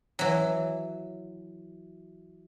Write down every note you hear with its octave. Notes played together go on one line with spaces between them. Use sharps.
E3 F#3